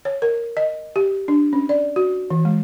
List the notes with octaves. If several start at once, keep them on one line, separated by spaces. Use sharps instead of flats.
C#5
A#4
D#5
G4
D4
C#4
D5
F#4
E3
G#3